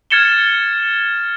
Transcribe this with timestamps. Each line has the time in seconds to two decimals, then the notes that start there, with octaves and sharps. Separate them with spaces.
0.11 F6 G#6 A6 C#7 E7 G7